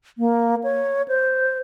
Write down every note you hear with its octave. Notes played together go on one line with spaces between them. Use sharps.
A#3
C#5
C5